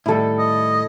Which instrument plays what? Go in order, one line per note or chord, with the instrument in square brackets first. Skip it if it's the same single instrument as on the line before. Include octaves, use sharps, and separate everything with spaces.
[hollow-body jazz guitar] A2 D#3 G3 [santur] E4 A4
[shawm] D#5